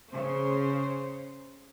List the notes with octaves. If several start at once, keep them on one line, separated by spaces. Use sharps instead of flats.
C#3 C5